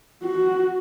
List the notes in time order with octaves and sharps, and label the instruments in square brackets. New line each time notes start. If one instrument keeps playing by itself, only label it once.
[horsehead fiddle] F#4